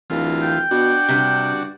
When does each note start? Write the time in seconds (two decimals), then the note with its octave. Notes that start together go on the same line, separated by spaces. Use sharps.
0.10 D1 E3 F4
0.42 G5
0.71 B2 D4 F#4
1.09 G2 C3